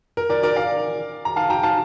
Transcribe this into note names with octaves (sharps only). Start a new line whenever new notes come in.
A#4
A#4 D5
A#4 D5
D5 F5
A#5
F5 A5
G5 A#5
F5 A5